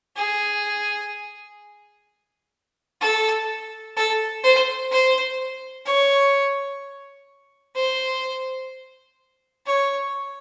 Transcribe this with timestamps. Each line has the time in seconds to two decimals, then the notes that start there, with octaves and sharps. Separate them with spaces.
0.16 G#4
3.01 A4
3.97 A4
4.44 C5
4.91 C5
5.86 C#5
7.76 C5
9.66 C#5